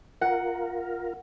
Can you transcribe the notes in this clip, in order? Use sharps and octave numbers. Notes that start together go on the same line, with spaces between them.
F4 A#4 F#5